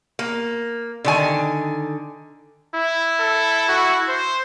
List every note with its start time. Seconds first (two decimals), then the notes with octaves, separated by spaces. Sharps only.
0.19 A#3
1.04 D3 D#3 G#5
2.75 E4
3.20 A4
3.68 F#4
4.09 C5